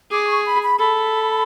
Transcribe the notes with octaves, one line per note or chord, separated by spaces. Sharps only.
G#4 D6
C#6
B5
B5
A4 B5